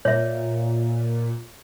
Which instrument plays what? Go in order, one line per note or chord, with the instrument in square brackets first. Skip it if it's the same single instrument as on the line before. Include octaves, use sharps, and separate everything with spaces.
[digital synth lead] A#2 [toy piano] C#5 E5